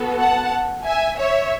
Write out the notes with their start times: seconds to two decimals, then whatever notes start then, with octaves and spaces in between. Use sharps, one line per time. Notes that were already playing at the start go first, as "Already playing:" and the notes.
Already playing: B3 F#4 A4
0.20 F#5 A5
0.85 E5 G#5
1.19 C#5 E5